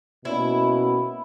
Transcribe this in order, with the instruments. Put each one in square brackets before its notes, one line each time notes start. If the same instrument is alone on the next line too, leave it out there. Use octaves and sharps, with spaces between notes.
[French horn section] B2 A#3 C#4 F#4 [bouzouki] E4